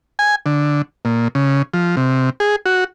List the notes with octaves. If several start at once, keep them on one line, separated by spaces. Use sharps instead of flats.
G#5
D3
A#2
C#3
F3
C3
G#4
F#4